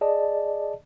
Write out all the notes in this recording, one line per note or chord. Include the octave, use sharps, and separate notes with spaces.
G#4 D5 D#5 A5